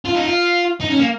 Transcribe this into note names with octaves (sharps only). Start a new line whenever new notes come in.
F4
D#4
F4
D#4
C#4
A#3